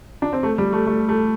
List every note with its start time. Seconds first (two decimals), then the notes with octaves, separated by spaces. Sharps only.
0.22 D4
0.33 C4
0.43 A3
0.58 G3
0.73 A3
0.87 A3
1.09 A3